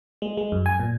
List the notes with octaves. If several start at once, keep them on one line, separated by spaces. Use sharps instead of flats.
G#3
G#3
F#2
G#5
A#2